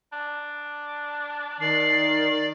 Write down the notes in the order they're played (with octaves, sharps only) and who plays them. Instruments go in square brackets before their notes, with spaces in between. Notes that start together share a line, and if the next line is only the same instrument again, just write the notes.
[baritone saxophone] D4
[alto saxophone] D#3 [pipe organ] D5 [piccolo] C7